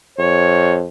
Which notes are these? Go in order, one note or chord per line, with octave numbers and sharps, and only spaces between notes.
F2 C#5